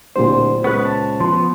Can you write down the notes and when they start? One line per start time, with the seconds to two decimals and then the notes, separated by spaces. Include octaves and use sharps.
0.16 D1 A#2 G4 C5 C6
0.64 C#2 B3 G#4 B4 C#6
0.85 A5
1.20 F3 B3 C6